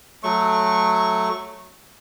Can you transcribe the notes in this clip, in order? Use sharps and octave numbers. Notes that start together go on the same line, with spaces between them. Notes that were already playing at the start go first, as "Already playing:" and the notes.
F#3 A3 C#6